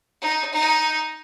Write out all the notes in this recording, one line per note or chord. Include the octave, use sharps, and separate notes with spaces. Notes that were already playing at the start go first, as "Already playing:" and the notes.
D#4
D#4